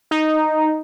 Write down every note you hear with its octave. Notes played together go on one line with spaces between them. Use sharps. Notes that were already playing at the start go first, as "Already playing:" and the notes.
D#4